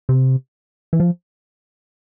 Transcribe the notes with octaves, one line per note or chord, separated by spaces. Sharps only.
C3
E3
F3